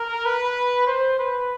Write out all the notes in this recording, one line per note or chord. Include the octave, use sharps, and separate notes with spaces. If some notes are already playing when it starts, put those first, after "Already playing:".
Already playing: A#4
B4
C5
B4